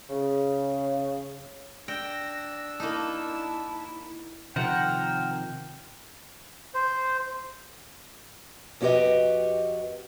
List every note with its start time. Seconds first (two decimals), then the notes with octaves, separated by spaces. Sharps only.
0.09 C#3
1.88 D4 G5 E6 A#6
2.80 A#3 D#4 E4 A5
4.56 C3 D#3 F3 A#4 C5 F#5 G5
6.74 C5
8.81 F2 C#4 F#4 G4 B4 D#5